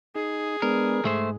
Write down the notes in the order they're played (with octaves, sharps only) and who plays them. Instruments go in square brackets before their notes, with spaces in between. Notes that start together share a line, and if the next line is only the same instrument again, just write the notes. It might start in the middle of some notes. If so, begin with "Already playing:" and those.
[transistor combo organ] D#4 [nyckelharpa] G#4
[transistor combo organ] G#3 B3 D4 [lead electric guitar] A#4
[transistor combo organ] G#2 [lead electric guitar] A3 C5